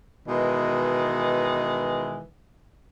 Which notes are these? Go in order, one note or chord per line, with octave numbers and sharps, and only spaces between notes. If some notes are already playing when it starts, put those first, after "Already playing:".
B2 D#3 E3 G#3